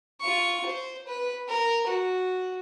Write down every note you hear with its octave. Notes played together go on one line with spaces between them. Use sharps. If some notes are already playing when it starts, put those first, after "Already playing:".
F4 C#6
C5
B4
A#4
F#4